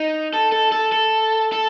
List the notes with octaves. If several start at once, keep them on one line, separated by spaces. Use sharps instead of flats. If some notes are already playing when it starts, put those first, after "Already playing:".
Already playing: D#4
A4
A4
A4
A4
A4